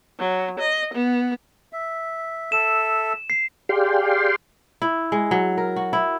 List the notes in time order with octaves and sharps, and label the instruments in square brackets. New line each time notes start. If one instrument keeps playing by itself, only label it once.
[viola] F#3
D#5
B3
[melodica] E5
[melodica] A4 E5 [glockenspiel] E7
[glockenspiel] C7
[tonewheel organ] G4 G#4 D5 F5 G5 C6
[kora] E4
G#3
F#3
A#4
F#4
E4